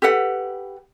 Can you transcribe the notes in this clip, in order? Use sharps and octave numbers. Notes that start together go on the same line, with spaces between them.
G4 A4 B4 F#5